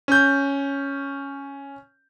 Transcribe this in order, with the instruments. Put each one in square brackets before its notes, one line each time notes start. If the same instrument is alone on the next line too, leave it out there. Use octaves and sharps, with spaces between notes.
[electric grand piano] C#4 G6